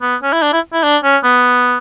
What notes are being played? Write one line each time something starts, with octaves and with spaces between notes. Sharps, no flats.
B3
C#4
E4
D4
E4
E4
D4
C#4
B3